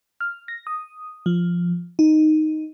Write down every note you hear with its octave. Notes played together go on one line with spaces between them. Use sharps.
F6
A#6
D#6
F3
D#4